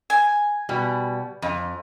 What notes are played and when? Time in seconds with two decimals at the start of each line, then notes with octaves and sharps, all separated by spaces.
0.10 G#5
0.69 B2 G3
1.42 F2